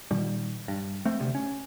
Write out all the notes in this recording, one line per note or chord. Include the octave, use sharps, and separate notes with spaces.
A#2 D#3 G3
G2
A3 C4
D2 C3
C#4